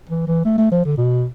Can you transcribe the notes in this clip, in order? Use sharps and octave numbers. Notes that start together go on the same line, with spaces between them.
E3
E3
A3
A3
F3
D3
B2